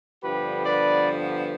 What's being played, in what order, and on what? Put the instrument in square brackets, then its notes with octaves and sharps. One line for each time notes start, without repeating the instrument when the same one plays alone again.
[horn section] G2 D3 F3 B3 G4 B4
B4 D5